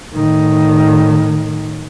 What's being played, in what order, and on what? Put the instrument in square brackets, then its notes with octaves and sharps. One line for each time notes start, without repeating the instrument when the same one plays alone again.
[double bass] A2 D#3